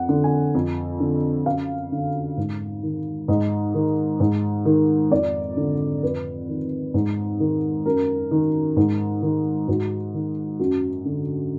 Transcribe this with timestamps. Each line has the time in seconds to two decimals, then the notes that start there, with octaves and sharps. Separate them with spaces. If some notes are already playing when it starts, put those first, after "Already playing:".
Already playing: F2 F#5
0.09 D3
0.24 G#5
0.55 F2
1.00 D3
1.46 F#2 F5
1.92 D3
2.38 G#2
2.83 D#3
3.28 G#2 D#5
3.74 D#3
4.20 G#2
4.65 D#3
5.11 F2 D5
5.57 D3
6.03 F2 B4
6.49 D#3
6.94 G#2
7.40 D#3
7.86 F#2 A#4
8.31 D#3
8.77 G#2
9.22 D#3
9.68 G#2 F#4
10.14 D#3
10.59 F#2 F#4
11.05 D3